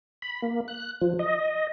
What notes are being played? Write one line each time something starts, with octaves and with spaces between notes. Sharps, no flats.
B5
A#3
F#6
F3
D#5